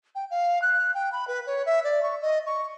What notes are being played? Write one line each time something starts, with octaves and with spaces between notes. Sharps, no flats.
G5
F5
F#6
G5
B5
B4
C#5
E5
D5
C#6
D#5
C#6